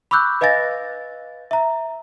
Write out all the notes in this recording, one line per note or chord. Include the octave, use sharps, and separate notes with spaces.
B5 C#6 D6 E6 F#6 G6
B4 D#5 F5 G#5 A6 A#6
E5 A#5